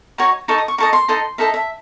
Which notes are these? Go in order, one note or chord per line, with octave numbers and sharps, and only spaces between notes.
D#4 F#4 C#5
D#4 A4 D#5 C#6
D#6
C#6
D#4 A4 D#5 C#6
C6
D#4 A4 D#5 C6
D#4 A4 D#5 E5
E5